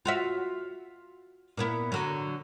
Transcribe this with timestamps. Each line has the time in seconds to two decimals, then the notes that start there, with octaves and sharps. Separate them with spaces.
0.05 F4 F#4 E5
1.57 A#2 B3 E4
1.92 D3 F#3